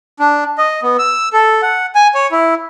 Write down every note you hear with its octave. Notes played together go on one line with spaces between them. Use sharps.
D4
D#5
B3
E6
A4
F#5
G#5
C#5
E4